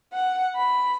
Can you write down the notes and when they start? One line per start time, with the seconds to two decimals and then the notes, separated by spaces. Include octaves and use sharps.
0.12 F#5
0.55 B5